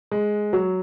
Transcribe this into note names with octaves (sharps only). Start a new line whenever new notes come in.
G#3
F#3